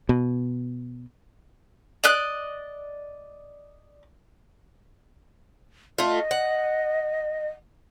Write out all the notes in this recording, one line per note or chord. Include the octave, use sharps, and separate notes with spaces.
B2
D5 D#5 F#6
A3 F4 D#5
F#5